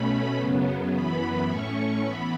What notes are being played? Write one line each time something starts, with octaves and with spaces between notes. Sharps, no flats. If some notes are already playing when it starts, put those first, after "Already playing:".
Already playing: B2 A3 C#4 B5
F#2 C#3 F#3 B3
F#2 E3 B3 B5
A2 A3 C#4 C#6
E3 B3 B5